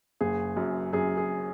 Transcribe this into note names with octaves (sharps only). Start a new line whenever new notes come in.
F#1 G#4
F#2
F#2 G#4
G#4